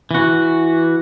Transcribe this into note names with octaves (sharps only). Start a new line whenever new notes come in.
E3 F#4